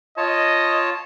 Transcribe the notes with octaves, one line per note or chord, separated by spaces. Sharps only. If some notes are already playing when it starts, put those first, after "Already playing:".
F4 C#5 D#5 A5